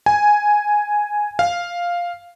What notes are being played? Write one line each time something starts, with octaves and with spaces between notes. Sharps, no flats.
G#5
F5